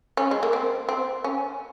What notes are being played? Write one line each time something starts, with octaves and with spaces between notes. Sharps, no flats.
C#4
G#3
A#3
C4
C4
C#4